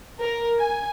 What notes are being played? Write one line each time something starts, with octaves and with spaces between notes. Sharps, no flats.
A#4
G#5